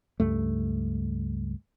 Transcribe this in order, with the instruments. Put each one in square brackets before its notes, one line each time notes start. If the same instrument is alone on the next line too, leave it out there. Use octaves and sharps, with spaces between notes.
[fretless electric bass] C#2 G2 A3